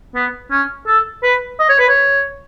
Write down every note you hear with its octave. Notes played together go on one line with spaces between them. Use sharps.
B3
C#4
A4
B4
D#5
C#5
B4
C#5